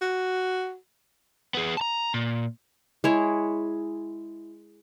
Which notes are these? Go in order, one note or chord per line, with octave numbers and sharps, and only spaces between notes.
F#4
B3 G#4
A5 A#5
A#2
G#3 E4 C#5